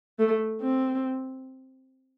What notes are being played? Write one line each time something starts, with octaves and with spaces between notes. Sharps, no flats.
A3
C4